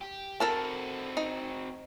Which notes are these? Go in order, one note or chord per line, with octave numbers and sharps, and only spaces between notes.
G4
C4 F#4 A4 A#4 A5
D#4